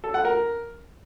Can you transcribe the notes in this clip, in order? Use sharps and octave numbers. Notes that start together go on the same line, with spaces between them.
A4
F#5
A#4